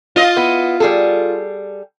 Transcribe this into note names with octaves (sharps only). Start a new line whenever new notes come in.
F4 D#5
B3 E4
G3 G#4 A4